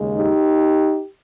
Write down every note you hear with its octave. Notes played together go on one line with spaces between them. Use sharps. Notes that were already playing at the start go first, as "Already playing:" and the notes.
Already playing: D#2 C#3 G#3
D#4 G4